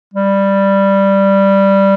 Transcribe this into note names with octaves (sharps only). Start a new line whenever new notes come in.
G3